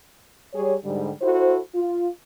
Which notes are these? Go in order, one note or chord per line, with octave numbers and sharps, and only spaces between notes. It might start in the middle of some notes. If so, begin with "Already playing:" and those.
G3 G4 G#4 C#5
G#2 D3 G3
E4 F#4 A4 C5
F4